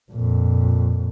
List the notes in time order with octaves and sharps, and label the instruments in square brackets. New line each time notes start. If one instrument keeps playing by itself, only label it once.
[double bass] F2 A#2